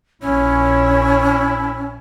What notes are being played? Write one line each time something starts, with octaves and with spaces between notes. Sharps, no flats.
A#1 C#4 E4 C#5